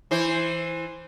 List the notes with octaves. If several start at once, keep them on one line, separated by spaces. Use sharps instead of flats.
E3 E4 C5